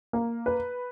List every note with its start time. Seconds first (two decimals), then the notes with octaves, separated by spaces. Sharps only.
0.13 A#3
0.46 B4